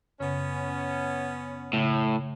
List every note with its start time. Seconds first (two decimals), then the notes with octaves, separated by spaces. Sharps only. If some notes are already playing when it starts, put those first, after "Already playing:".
0.20 F#2 C#3 B3 C#4
1.73 A2 C#3